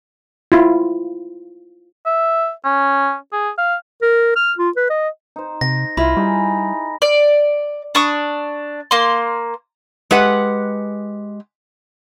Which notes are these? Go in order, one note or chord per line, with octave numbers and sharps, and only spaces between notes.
E4 F4
E5
C#4
G#4
F5
A#4
F6
F4
B4
D#5
D#4 C5
C3 A#6
C2 E4 F4 B5
G3 D#4 G#4
D5
D4 C#6 D#6
A#3 C6
G#3 G4 B4 F#5